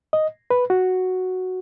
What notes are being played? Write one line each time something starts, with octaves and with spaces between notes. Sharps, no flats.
D#5
B4
F#4